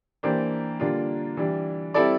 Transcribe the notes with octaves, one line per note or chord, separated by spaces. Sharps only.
E3 A#3 D4 G4 C5
D3 G3 A#3 D4 F4
E3 G3 D4
G3 C4 E4 A4 D5